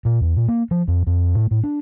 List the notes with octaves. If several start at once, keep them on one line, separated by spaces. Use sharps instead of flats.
A#2
E2
A#2
A#3
F3
F2
F2
A2
A2
D4